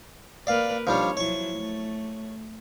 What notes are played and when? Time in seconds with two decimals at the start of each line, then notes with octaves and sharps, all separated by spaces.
0.47 A#3 A#4 B4 D5 F5
0.87 F3 G3 D4 D#4 C#5
1.17 F3 F#3 E4 C#5 C#6
1.55 A3